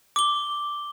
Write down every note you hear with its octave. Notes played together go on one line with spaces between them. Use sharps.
D6 G7